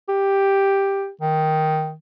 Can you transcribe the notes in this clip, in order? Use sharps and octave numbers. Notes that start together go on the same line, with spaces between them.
G4
D#3